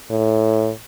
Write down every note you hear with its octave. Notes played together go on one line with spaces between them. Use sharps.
A2